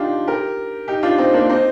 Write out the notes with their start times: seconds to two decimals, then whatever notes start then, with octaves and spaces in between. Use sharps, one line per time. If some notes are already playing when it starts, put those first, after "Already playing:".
Already playing: D4 D#4 F4 G4
0.27 G4 A#4
0.88 D#4 G4
1.03 D4 F4
1.18 C4 D#4
1.34 A#3 D4
1.49 C4 D#4